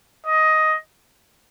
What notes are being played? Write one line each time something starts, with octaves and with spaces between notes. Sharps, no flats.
D#5